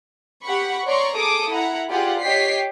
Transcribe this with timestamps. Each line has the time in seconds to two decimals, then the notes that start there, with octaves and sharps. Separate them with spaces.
0.43 G4 F#5 B5 C#6
0.86 C#5 D5 A#5 C6 C#6
1.16 G#4 A4 D6 D#6
1.49 E4 F#5 A#5
1.89 F4 G4 G#4 D5 F#5
2.21 G4 C#5 D#5 G5 B6 C7